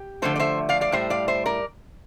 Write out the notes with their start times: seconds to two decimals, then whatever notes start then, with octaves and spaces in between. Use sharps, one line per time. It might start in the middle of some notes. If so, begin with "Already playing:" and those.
Already playing: G4
0.22 D3 F3 A3 A4 C5
0.36 D5
0.39 C5 E5
0.69 D5 F5
0.81 D5 F5
0.92 A2 G3 C5 E5
1.10 D5 F5
1.28 C5 E5
1.46 A#4 D5